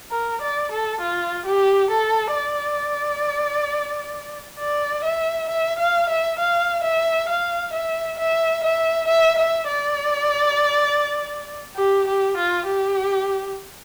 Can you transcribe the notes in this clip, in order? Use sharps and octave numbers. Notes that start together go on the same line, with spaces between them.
A#4
D5
A4
F4
G4
A4
D5
D5
E5
E5
F5
E5
F5
E5
F5
E5
E5
E5
E5
E5
D5
G4
G4
F4
G4